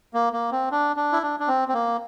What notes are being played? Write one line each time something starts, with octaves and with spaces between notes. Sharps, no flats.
A#3
A#3
C4
D4
D4
E4
D4
D4
C4
C4
A#3